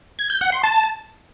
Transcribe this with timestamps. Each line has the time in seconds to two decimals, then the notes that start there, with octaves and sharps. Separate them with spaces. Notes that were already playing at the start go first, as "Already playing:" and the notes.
0.19 G#6
0.30 G6
0.41 F#5
0.52 C6
0.63 A5